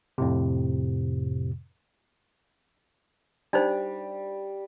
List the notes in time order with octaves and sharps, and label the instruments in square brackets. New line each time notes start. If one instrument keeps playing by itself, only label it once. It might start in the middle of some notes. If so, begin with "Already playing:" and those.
[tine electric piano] F2 A2 C3
[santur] G3 [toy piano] D4 D#4 C5